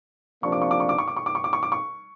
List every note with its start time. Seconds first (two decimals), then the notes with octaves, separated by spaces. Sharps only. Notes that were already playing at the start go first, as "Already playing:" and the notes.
0.43 C3 F3 A#3 D4 C#6
0.52 D6
0.62 C#6
0.71 D6
0.80 C#6
0.89 D6
0.98 C#6
1.08 D6
1.17 C#6
1.26 D6
1.35 C#6
1.44 D6
1.53 C#6
1.63 D6
1.72 C#6